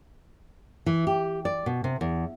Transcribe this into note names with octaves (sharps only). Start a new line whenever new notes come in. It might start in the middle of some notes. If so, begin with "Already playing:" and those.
E3
G4
D5
B2
C3
E2